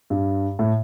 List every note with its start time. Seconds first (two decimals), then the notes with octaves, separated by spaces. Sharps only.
0.10 G2
0.59 A2